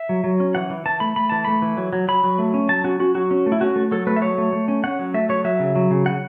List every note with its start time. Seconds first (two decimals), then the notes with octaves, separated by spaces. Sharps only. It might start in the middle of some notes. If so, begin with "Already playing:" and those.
Already playing: E5
0.09 F#3
0.24 F#3
0.40 C#4
0.55 E3 F#5
0.70 E3
0.86 E3 A5
1.00 A3 B5
1.16 A3 B5
1.29 E3 A5
1.45 A3 B5
1.62 E3
1.77 F#3
1.93 F#3
2.08 F#3 B5
2.24 F#3
2.39 A3
2.54 C#4
2.69 F#3 A5
2.84 C#4 F#4
3.00 C#4 F#4
3.15 F#3 F#4
3.31 C#4
3.46 A3
3.52 E4
3.61 C#4 F#4
3.76 A3
3.91 F#3 A4
4.07 A3 B4
4.16 E5
4.22 F#3 C#5
4.38 A3
4.52 A3
4.68 C#4
4.84 C#4 F#5
4.99 F#3
5.14 A3 E5
5.29 F#3 C#5
5.44 F#3 E5
5.60 C#3
5.75 F#3
5.91 C#3
6.06 C#3 F#5